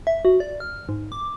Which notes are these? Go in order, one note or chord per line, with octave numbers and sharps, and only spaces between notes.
E5
F#4
D5
F6
G#2
D6